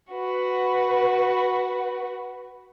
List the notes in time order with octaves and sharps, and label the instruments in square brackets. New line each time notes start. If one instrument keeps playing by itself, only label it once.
[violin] F#4 B4